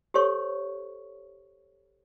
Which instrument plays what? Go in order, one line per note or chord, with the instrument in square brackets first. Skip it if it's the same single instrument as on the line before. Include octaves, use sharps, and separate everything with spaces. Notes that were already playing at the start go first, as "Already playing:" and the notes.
[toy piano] G4 A4 C5 C#5 C#6